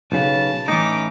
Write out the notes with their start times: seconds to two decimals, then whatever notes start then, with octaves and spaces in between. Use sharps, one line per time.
0.12 B1 C#3 A5
0.68 A2 E3 C#4 D#4 D6